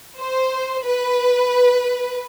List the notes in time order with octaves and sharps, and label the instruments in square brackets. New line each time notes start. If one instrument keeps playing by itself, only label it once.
[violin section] C5
B4